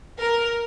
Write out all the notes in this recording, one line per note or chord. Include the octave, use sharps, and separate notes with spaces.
A#4